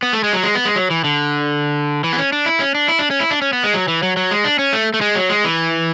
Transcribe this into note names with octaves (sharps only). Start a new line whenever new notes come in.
B3
A3
G#3
F#3
G#3
B3
G#3
F#3
E3
D3
E3
B3
C#4
D4
E4
C#4
D4
E4
D4
C#4
E4
D4
C#4
B3
G#3
F#3
E3
F#3
F#3
G#3
D4
C#4
A3
A3
G#3
F#3
G#3
E3